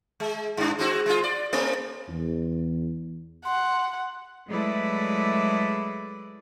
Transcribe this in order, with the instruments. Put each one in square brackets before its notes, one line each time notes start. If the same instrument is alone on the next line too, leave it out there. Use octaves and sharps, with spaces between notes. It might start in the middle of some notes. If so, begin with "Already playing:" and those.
[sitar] G#3
G2 D4
G#3 C4 F#4
G#3 F4
D5
A3 C4
[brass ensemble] E2
[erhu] F#5 [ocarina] C6
[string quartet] F#3 G#3 A3 E4 B4 D5